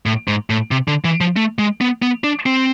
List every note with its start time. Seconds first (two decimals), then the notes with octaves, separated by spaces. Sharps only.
0.06 A2
0.28 G#2
0.50 A2
0.71 C3
0.88 D3
1.04 E3
1.21 F3
1.36 A3
1.59 G#3
1.81 B3
2.02 B3
2.24 D4
2.46 C4